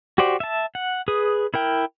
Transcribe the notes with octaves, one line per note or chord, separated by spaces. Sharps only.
F#4 G4 C5 D5
E5 A5
F#5
G#4 B4 D#6
E4 A#4 G5